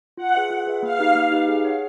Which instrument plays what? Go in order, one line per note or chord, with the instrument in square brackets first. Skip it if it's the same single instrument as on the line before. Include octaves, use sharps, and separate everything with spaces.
[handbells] F4 [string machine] F#5
[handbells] G#4 B4 E5
F4
G#4 B4 E5
[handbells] A#3 [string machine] F5
[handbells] D#4 G4 B4
A#3
D#4 G4 B4
G#4
C#5 F#5